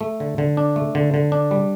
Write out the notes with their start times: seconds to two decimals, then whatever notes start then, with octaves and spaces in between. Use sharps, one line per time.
0.01 A3
0.20 D3
0.38 D3
0.57 D4
0.76 A3
0.95 D3
1.14 D3
1.32 D4
1.51 G3